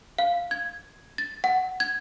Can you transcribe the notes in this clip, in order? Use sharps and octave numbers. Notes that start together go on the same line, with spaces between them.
F5
G#6
A6
F#5
G#6